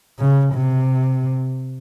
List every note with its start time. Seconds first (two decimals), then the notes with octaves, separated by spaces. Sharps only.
0.19 C#3
0.53 C3